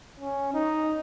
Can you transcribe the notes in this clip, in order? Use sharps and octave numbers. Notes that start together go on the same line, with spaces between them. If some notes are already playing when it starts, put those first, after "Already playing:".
C#4
D#4